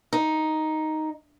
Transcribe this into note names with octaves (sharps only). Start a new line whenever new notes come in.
D#4